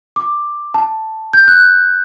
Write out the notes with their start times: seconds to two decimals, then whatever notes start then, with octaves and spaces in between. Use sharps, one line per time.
0.16 D6
0.74 A5
1.33 G6
1.48 F#6